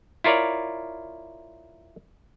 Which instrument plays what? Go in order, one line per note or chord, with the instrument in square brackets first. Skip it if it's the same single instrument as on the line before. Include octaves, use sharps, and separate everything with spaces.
[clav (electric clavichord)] E4 F4 A#4 C#5 D5